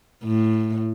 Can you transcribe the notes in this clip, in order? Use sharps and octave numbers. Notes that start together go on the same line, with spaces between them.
A2